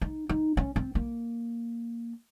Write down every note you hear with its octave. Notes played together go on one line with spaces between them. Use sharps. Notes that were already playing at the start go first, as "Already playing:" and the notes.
D#4
D#4
C#4
C4
A#3